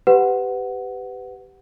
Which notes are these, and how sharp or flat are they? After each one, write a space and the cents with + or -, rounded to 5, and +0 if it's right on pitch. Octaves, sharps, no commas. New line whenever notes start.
G4 +0 B4 +25 F#5 +0